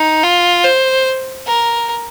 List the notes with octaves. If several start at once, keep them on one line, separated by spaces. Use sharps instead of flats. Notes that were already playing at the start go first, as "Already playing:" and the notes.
Already playing: D#4
F4
C5
A#4